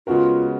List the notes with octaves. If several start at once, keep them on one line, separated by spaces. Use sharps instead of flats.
C#3 G#3 B3 F4 F#4 A#4